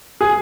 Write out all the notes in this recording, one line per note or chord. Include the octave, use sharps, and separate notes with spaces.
G#4